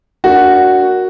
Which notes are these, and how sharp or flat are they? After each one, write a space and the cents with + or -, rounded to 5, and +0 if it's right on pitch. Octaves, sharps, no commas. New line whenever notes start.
A#3 +0 D4 -15 F#4 +0